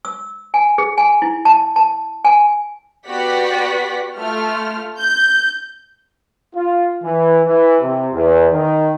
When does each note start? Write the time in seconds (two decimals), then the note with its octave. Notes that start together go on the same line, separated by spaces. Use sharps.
0.05 E6
0.54 G#5
0.78 G#4
0.98 G#5
1.22 E4
1.45 A5
1.76 A5
2.25 G#5
3.06 B3 F#4 G4 D5 F#5 B6
4.15 A3 F4 F6
4.98 G6
6.55 F4
7.03 E3
7.45 E3
7.81 C3
8.13 E2
8.52 D#3